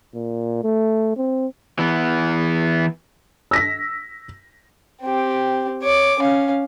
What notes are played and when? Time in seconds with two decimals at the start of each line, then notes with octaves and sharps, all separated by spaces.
0.14 A#2
0.63 A3
1.17 C4
1.79 E3 B3
3.51 E6 A#6 B6
5.02 C4 G4
5.82 C#5 D6
6.20 C#4 F5